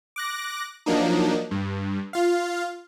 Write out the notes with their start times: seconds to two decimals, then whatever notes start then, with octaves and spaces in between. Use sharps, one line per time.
0.16 D6 F#6 A#6
0.86 F3 F#3 A#3 D4 D#4
1.51 G2
2.13 F4 F5